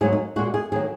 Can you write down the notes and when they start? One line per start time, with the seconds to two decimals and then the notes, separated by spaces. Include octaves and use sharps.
0.01 G#2 F#3 A#3 G#4
0.12 D#4
0.36 G#3 F#4
0.39 A#2
0.54 G#4
0.72 D#3 F#3 A#3 G#4